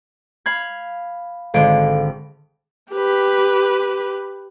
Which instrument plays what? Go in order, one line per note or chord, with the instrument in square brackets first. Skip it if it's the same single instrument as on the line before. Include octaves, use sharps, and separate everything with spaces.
[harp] F5 B5 G#6
[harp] G#1 D3 [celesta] A4 F5 D7
[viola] G4 B4